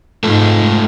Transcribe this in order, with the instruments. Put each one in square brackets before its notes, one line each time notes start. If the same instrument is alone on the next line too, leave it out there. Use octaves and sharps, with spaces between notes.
[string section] G#2 [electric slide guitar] A3 F4 A4